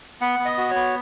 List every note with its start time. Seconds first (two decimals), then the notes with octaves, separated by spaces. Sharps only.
0.21 B3 F#5
0.39 B3
0.45 D#5
0.58 F#4
0.70 C#5
0.75 B3